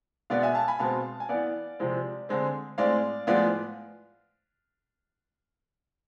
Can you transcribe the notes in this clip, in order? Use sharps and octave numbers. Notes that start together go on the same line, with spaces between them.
B2 G#3 B3 D5 F5
E5 G#5
F5 A5
G#5 B5
B2 G#3 C4 F5 A5
G#5
E3 B3 D5 F5
C3 F3 G#3 C4
D3 G#3 C4
A2 G#3 C4 D5 F5
A2 F3 G#3 B3 D5 F5